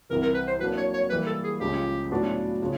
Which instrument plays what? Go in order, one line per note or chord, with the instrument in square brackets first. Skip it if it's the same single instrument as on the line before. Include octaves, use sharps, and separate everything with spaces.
[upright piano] C2 C3 E3 [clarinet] A#4
[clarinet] A#4
B4
C5
[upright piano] F#3 A#3 D4 [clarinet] B4
[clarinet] C#5
C#5
[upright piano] E3 G3 A#3 [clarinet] B4
[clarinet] A4
G#4
[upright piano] C#2 C#3 F3 [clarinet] G4
[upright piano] A2 F#3 B3 D4 F#4
C#3 F3